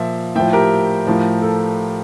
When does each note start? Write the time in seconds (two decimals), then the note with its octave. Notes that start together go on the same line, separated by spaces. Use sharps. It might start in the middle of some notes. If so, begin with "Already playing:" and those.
Already playing: A#2 F3 E5
0.35 A2 F3 E5 G5
0.53 G4 A#4
1.07 A2 F3
1.42 A4